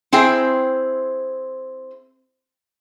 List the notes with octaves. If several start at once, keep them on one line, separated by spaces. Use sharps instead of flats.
C4 E4 G#4 G5